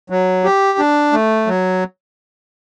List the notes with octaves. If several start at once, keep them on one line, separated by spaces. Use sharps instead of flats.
F#3
G4
D4
A3
F#3